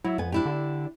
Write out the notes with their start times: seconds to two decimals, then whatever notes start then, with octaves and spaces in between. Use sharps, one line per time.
0.04 F#3 E4
0.18 F2 B3 G#5
0.32 D4 E4 G4
0.46 D3